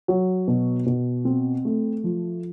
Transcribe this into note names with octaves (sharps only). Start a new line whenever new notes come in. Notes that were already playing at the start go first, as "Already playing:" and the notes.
F#3
B2
B2
C4
A3
F3